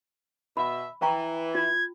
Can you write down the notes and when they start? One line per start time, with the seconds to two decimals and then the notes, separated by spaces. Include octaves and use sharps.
0.57 B2 E5 B5
1.02 E3 G5 A#5 C#6
1.55 F4 G#6